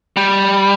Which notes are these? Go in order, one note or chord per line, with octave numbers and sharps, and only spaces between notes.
G3